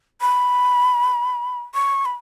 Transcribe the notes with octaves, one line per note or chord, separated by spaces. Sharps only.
B5
C#6
B5